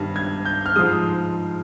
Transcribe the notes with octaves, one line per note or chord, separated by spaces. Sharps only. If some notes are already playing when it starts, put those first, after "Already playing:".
Already playing: G2 D#3 G3 A#6
G#6
G6
F6
G#2 F3 G#3 D#6